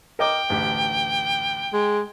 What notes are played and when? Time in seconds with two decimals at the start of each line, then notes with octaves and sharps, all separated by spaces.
0.19 A#4 D#5 G5 D6
0.50 A1 D2 G4
1.73 G#3